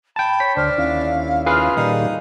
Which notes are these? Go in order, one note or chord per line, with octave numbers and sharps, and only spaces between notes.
G5 A5 B5
C#5 B6
D2 D4 C5 F6
D#2 C#4 E4 F5
F4 G#4 B4 F5 F6
A#2 D#3 G3 D#4 D5